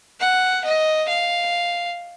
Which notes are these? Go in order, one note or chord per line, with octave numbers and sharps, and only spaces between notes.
F#5
D#5
F5